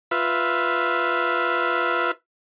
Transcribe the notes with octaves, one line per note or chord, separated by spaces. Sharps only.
F4 B4 E5